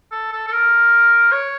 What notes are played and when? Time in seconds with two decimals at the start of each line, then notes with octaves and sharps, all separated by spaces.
0.12 A4
0.33 A4
0.48 A4
0.52 A#4
1.32 C#5